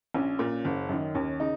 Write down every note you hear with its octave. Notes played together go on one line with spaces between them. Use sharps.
A#1 C#4
A#2
F#1
F#2 D#3
D#2 C#4
C#3 D#4